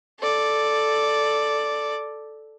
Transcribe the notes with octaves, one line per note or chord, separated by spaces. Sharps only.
A4 D5